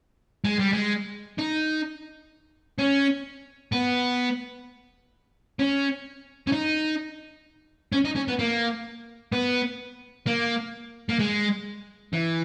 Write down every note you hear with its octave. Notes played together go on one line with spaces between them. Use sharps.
G#3
G3
G#3
D#4
C#4
B3
C#4
C#4
D#4
C#4
D#4
C#4
B3
A#3
B3
A#3
A#3
G#3
E3